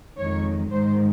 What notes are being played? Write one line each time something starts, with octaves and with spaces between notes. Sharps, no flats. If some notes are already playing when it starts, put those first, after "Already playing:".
F2 D#3 G#3 C#5
G#2 D#3 G#3 C5